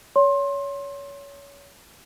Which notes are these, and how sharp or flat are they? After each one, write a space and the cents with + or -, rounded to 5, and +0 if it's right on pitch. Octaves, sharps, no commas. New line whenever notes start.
C#5 +25 C6 +25